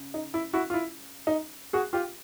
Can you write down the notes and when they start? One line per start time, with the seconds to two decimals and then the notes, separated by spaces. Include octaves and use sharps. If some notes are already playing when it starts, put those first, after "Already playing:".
Already playing: C#3
0.14 D#4
0.34 E4
0.53 E4 F#4
0.70 F4
0.74 E4
1.27 D#4
1.73 F#4 G#4
1.93 F4 G4